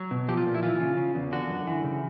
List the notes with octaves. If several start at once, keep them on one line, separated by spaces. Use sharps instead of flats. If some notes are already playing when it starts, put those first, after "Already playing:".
Already playing: F#3
B2
F3 G4
F4
A#2
E4
E3 F4
C#3
C#3
E2
D3 F#4
F#2
E3
C#3